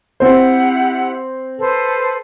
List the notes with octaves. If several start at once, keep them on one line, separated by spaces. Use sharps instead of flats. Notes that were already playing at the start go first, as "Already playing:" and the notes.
C4 E4 G4 C5 F#5
A4 B4 C5